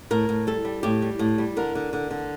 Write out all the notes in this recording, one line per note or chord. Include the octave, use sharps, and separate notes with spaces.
A2 A#4
A2
G3 A4
G3
A2 G4
G3
A2
G3
D3 A#4
D3
D3
D3